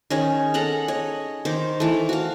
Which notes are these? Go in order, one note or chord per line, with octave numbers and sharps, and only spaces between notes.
D#3 C#4 G#4
G#4 A4 F#5 A#5
C#5 D#5
D#3 C5 D6
E3 A3
F#4 F5